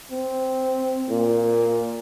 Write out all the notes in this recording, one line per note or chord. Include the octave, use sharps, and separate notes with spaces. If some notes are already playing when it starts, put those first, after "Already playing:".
C4
A#2